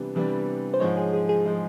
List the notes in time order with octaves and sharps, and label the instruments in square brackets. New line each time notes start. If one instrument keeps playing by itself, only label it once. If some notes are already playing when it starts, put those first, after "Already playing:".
Already playing: [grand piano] C3 E3 G3 B3 D4
C3 E3 G3 B3 D4
[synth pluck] C5
[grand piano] G#2 F3 G#3 [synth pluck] C#5
[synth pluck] G#4
G#4
G#4
[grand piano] F3 G#3